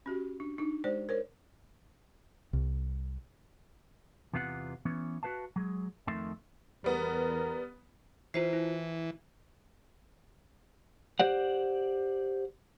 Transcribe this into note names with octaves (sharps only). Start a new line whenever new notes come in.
C#4 F#4 G4
D4
D4 D#4
G#3 G4 C5 D5
A#4 C5 C#5
C2
E2 C3 B3 F4 B4 F#5
E3 B3 C#4 C#5
F#4 G#4 B4 F5 A5
F#3 G#3
F2 D#3 A3 E5 C6
E2 G3 B3 A#4
E3 F4 C5 C7
E4
G4 C5 D5 F#5